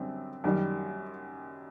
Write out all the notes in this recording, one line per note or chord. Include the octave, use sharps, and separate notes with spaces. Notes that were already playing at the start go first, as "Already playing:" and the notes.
Already playing: F#2 D3 G3 C4
F#2 D#3 G3 G4